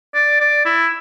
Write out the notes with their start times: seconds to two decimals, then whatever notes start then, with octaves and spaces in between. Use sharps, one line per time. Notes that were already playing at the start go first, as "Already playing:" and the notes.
0.15 D5
0.40 D5
0.66 E4